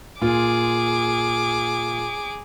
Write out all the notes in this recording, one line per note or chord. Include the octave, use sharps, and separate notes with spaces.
A#2 F4 G#4 D6